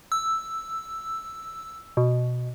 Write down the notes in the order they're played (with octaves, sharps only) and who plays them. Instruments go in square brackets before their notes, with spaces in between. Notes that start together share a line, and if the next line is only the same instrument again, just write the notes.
[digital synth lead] E6
B2